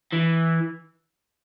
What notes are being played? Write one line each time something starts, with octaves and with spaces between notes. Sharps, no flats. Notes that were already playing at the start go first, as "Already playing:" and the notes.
E3